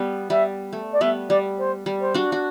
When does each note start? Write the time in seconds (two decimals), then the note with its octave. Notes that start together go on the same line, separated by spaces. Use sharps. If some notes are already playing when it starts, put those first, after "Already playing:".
Already playing: G3 B3
0.30 G3 E5
0.73 A3
0.92 D5
1.01 G3 B3 E5
1.29 G3 D5
1.58 C5
1.86 G3
2.00 C5
2.14 D4 F#4
2.32 F#4